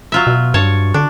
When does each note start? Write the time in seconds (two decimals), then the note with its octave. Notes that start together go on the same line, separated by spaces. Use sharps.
0.12 F#3 F4 E5
0.27 B2
0.54 G2 C#5 A5
0.94 D3 D4